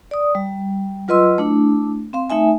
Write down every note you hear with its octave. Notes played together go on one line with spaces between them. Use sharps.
D5 D#6
G3
F#3 F4 B4 D#5 C6 E6
A3 D4 E4
C4 F5 C6
A3 D#4 E5 G#5